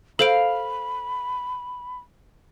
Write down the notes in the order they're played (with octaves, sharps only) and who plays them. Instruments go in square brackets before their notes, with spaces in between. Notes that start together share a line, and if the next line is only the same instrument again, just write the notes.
[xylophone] A4 C5 D7 [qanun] F5 [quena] B5